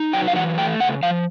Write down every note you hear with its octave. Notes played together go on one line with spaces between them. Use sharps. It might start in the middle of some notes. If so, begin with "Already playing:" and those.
Already playing: D#4
F#3 G5
F5
E3 F#5
A3 G5
C#3 F#5
F3 F5